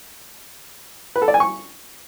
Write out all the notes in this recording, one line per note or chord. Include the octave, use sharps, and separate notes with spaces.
B4
A4
D5
G#5
C#6